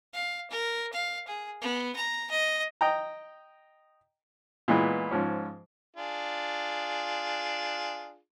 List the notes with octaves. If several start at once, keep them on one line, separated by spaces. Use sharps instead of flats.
F5
A#4
F5
G#4
B3
A#5
D#5
D#5 G5 A#5
A#2 E3 G#3 B3
G#2 F3 C#4
D4 F4 G#4